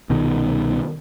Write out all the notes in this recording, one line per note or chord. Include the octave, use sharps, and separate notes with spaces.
C2 B2 D#3